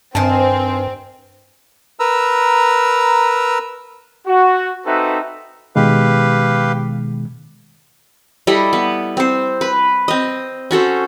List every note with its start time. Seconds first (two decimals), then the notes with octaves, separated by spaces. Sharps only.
0.15 G2 D#3 C4 G#5 A5
2.00 A#4 B4 A#5 E6
4.27 F#4
4.86 C4 D#4 F#4 A4 B4 E5
5.76 B2 D#3 G#3 G4 B4 F5
8.47 G3 E4 A4 D#5
8.73 B3
9.17 C4 C5
9.61 B4
10.08 C4 D#5
10.71 C#4 F#4 A4 C5